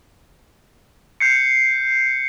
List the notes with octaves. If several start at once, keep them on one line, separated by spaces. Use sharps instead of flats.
G6 C7 C#7